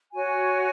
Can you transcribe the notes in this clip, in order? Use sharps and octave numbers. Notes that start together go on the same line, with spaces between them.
F#4 C#5 G#5